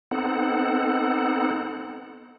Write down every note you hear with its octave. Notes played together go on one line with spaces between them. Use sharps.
B3 C4 D#4 A4 F#5